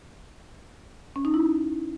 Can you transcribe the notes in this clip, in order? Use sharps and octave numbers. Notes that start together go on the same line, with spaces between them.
C#4
D#4
E4